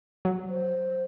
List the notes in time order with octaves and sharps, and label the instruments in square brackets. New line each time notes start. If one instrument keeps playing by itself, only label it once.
[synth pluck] F#3
[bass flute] C5